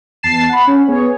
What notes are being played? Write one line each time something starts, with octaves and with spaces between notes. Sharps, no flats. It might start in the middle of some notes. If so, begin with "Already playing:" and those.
E2 A5 A6 C7 E7
F#5 B5
C#4
B3 G#4 C#5